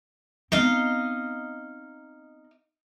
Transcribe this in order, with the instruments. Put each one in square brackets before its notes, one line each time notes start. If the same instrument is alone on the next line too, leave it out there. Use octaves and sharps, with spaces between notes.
[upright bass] B3 C4 [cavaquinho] D#4 D#5 F5